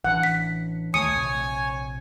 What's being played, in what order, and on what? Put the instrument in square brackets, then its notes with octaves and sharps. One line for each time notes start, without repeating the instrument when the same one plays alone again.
[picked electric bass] A1 E3 D4 [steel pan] F#5
[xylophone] B6
[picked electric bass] D2 D#3 A3 [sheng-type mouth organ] C#5 G#5 [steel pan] D#6 [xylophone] C#7
[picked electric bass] A#1 C3